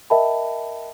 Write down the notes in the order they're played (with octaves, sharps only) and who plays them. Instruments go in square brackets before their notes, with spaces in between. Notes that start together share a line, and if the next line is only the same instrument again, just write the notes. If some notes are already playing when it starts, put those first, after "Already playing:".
[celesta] A#4 D#5 E5 G5 A5 B5